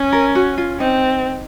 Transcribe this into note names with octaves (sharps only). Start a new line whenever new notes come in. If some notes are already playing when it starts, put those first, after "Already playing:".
Already playing: C#4
A#4
F#4
F4
C4 D#4